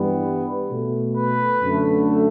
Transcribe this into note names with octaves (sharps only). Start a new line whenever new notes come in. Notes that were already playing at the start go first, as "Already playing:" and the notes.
Already playing: G2 E3 G3 B3
B2 A3
B4
F#2 D3 A3